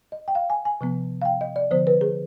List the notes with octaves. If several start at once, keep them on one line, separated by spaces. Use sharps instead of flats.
D#5
G5
F5
G#5
G#5
C3 F3 B3
F5
G5
D#5
D5
D3 F3 B3 C5
B4
G#4